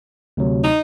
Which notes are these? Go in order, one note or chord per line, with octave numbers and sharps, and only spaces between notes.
D2 C3 F#3
D#4